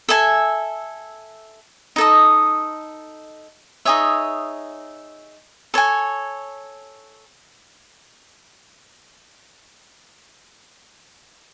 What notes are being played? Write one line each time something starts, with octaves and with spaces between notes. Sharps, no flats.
A4 E5 G#5
D#4 A4 D#5
D#4 G#4 C#5 E5
A4 C#5 G#5